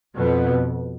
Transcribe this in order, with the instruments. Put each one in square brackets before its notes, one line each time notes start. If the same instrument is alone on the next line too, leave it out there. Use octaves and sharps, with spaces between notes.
[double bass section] F2 B2 B3